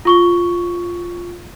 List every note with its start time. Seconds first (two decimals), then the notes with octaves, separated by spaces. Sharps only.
0.05 F4 C#6 G7